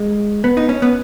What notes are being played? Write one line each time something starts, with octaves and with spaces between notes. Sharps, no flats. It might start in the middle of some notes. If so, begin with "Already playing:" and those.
Already playing: G#3
B3
D#4
C#4
B3